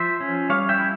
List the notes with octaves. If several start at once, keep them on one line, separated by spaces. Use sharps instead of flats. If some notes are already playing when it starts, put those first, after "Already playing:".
Already playing: F3 C5 E5
C#4
G3 C#5 F5
E5 G5
E4